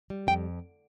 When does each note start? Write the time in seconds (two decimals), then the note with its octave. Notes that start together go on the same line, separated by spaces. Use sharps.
0.10 G3
0.27 F2 G5